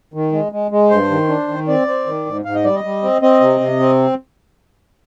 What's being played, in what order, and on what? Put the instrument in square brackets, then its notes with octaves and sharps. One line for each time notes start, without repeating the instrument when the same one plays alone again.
[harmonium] D#3
G#3
G#3
G#3
G2 C5
D#3
D4
D#3
C4 D5
C4
D#3
G#2
G#2 F5
D#5
G3 D5
D#5
G3
C4
C4 D#5
C3
C3
C4